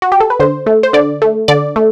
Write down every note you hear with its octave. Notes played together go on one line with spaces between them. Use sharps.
F#4
G4
A4
B4
D3 C5
A3
C5
D3 D5
A3
D3 D5
A3